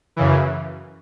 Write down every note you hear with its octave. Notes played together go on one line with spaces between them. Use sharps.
F#2 C#3 E3